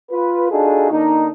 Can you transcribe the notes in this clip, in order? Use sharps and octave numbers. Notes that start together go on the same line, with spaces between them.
F4 B4
D4 D#4 F4 F#4 G#4 A4
D3 A#3 D4 D#4